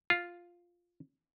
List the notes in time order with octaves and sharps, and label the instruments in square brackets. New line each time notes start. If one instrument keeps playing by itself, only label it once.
[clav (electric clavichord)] F4